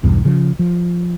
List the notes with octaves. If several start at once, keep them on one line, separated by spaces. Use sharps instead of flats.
B1 E2 G2
C#3 F3
F3